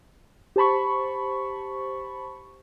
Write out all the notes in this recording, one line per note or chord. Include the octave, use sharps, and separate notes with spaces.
G4 C5 A5 B5 C#6